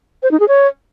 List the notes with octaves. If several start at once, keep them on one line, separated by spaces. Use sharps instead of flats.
C5
D#4
G#4
C#5